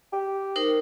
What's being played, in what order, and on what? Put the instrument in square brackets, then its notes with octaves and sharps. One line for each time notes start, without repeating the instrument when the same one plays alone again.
[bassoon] G4
[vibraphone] D#4 A#4 C5